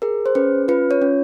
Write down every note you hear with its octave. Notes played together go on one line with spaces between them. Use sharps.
G#4 A#4
C5
C#4 B4
F4 B4
C#5
C#4